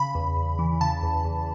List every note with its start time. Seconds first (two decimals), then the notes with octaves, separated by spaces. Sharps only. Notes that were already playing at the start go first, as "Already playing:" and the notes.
Already playing: C#3 B5
0.15 E2
0.36 E2
0.59 E3
0.81 C#3 A5
1.03 E2
1.25 E2